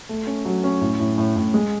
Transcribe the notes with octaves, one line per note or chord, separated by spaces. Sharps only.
A3
C#4
F#3
C#4
A2
A2
A2
A2
G#3